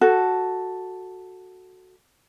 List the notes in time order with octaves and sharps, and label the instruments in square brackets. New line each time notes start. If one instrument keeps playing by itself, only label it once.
[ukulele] F#4 A4